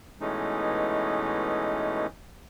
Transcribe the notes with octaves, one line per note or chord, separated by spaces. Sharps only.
B2 E3 G#3 A3 C#4 D#4